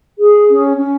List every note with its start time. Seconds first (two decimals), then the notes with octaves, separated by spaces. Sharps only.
0.19 G#4
0.49 C#4
0.78 C#4